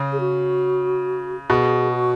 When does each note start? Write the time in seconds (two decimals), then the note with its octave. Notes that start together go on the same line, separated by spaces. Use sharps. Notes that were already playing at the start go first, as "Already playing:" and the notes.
Already playing: C#3
0.12 G#4
0.20 F#4
1.50 B2 G#4
1.93 F#4